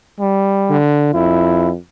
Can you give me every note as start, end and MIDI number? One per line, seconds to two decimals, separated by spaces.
0.20 0.77 55
0.70 1.10 50
1.14 1.74 41
1.14 1.69 64